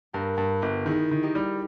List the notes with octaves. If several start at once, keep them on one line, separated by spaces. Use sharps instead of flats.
G2 G4 A#4
G2
G1
D#3 E4 G#4
D#3
D#4 G4
G3